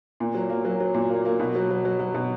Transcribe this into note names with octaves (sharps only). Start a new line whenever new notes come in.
A#2
F#3
A#3
F#3
F#3
A#2
A#3
A#3
B2
F#3
F#3
F#3
F#3
B2